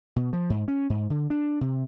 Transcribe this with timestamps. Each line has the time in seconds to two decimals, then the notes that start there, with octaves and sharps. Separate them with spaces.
0.16 B2
0.33 F3
0.50 G#2
0.68 C#4
0.90 G#2
1.10 D3
1.30 D4
1.61 C3